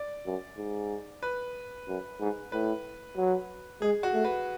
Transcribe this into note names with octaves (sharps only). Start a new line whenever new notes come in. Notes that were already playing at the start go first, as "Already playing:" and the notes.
Already playing: D5
F#2
G#2
B4
F#2
G#2
A2 B4
F#3
G#3 G#4
F#4
A3
B4